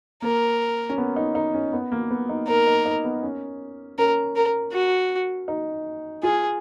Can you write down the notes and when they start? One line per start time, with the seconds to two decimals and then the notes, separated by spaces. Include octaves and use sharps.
0.22 A#3 A#4
0.90 C#4
0.98 B3
1.16 D#4
1.35 D#4
1.54 C#4
1.73 B3
1.92 A#3
2.11 B3
2.29 D#4
2.48 D#4 A#4
2.67 D#4
2.85 D#4
3.04 B3
3.23 C#4
3.98 C#4 A#4
4.36 A#4
4.73 F#4
5.48 D#4
6.23 F4 G#4